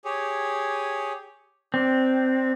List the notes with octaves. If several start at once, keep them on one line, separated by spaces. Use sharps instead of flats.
G4 G#4 C#5
C4 D4